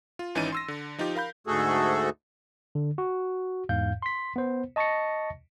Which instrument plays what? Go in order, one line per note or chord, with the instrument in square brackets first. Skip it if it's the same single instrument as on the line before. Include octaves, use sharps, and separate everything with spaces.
[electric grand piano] F4
G#1 E3 C#4 D#4 A6 D#7
C6 E6 A#6
D3
F3 D#4 F4 G4
A#4 F5 B5 G6
[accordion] D2 G#2 A3 F#4 G#4 A4
[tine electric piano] D3
F#4
E2 G#2 F5 G6
C6 B6
B3 C5
D#5 A5 C#6 A6 A#6 C#7